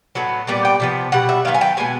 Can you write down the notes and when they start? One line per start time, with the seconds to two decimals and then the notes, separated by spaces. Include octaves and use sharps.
0.15 A2 F#3 B3
0.47 A#2 G3 B3 D5
0.65 G5
0.80 C3 F3 B3
1.12 B2 G3 F#5
1.29 E5
1.45 D#3 F#3 B3 F5
1.54 G#5
1.61 G5
1.77 B2 G#3 B3 G#5